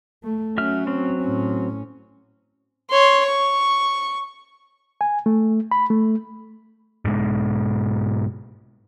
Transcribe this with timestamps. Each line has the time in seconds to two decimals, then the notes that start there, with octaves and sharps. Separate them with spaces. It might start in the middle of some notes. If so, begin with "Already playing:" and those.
0.23 A3
0.58 F#3 C#4 E5 F6
0.87 F#3 C4
1.20 A2 C#4
2.90 C#5 C6
3.26 C#6
5.01 G#5
5.26 A3
5.71 B5
5.90 A3
7.05 G#2 B2 G#3